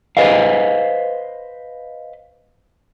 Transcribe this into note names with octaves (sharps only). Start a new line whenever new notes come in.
B4 C5 D#5 F5